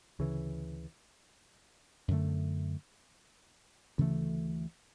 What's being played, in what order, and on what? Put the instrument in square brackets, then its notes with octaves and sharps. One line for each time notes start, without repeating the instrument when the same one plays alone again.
[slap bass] D2 C#3 E3
F#2 D3 A3
D2 C#3 E3 A3